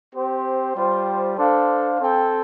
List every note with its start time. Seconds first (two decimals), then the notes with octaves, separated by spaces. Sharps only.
0.14 C4 G4 C5
0.76 G3 F4 C5 G5
1.37 D4 A4 C5 F5
1.99 C4 A4 C5 G5